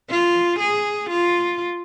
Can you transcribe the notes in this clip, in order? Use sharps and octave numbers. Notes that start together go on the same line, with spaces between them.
F4
G#4
F4